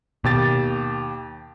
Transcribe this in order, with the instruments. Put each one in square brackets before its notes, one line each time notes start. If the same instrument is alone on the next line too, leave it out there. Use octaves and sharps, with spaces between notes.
[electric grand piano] D#2 G4 A6 [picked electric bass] B2